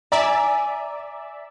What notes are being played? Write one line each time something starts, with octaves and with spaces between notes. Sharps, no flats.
D5 E5 G#5 A#5